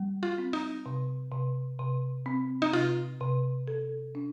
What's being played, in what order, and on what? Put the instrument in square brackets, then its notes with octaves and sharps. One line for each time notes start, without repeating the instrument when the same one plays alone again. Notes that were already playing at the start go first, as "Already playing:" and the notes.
Already playing: [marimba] G3
[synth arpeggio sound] F4
[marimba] C4
[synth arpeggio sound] D#4
[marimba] C3
C3
C3
C4
[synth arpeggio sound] D#4
[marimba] C3 [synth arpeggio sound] F4
[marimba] C3
A4
D4